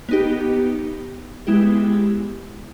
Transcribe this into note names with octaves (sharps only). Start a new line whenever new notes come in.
B3 D#4 G4
G#3 B3 E4 G4